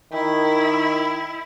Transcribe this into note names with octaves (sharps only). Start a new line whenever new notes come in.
D#3 E4